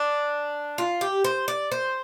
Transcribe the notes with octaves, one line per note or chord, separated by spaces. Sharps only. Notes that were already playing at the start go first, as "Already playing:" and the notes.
Already playing: D4
F4
G4
C5
D5
C5